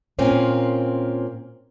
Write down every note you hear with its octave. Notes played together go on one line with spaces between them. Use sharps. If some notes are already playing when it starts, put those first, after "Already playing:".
A#2 A#3 C4 C#4